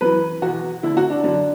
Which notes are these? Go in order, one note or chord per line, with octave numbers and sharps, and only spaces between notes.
F#2 E3 B4
E2 B2 F#4
D2 D3 E4
F#4
D4
F#2 D3 D4